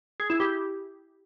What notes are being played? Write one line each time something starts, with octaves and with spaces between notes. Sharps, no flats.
G#4
E4
G4